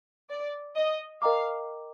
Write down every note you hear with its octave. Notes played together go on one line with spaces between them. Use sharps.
D5
D#5
A#4 D#5 F5 G5 A#5 D6